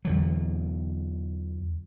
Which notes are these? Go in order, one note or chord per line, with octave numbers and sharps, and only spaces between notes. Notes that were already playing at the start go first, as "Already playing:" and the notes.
E2 D3 F#3